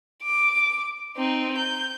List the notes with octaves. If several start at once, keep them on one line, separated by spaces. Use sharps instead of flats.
D6
C4 D#4
G6